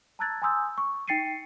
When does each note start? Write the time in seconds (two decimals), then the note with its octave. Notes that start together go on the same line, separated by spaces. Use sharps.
0.19 A5 A#5 E6 F#6 G#6 A6
0.42 G#5 A#5 C6 D#6 E6 G6
0.78 C#6
1.08 D#4 G5 A6 C7 C#7 D#7